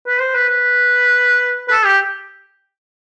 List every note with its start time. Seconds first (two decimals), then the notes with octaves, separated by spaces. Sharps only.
0.07 B4
0.21 C5
0.35 B4
0.49 B4
1.68 B4
1.71 A4
1.85 G4